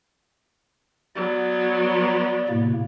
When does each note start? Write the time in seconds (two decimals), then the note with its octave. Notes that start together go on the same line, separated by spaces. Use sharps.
1.15 F#3 B3 D5
2.49 A2 C3 A#3